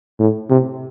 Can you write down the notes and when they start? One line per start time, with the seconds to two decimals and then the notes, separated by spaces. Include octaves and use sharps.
0.19 A2
0.50 C3